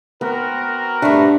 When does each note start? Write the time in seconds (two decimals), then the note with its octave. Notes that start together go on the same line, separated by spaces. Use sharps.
0.21 B3 C4 F#4 A#4
1.02 G2 A3 D4